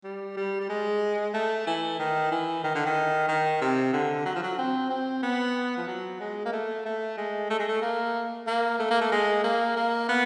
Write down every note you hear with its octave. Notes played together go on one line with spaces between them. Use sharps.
G3
G3
G3
G#3
A3
E3
D#3
E3
D#3
D3
D#3
D#3
C3
D3
F#3
F3
F#3
C4
C4
B3
F3
F#3
G#3
A#3
A3
A3
G#3
A3
G#3
A3
A#3
A#3
A3
A#3
A3
G#3
A#3
A#3
B3